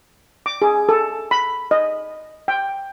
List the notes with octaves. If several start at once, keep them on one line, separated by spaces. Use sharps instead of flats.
D6
G#4
A4
B5
D#5
G5